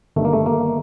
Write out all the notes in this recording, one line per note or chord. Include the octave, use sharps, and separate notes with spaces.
G1 G2 D#3 A3
A#3
A3
A#3